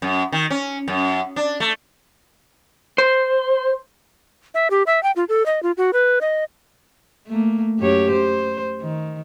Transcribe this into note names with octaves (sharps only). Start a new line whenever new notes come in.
F#2
D#3
C#4
F#2
D4
A3
C5
E5
G4
E5
G5
F4
A4
D#5
F4
F#4
B4
D#5
A3 A#3
F#2 G4 C#5
C5
D#3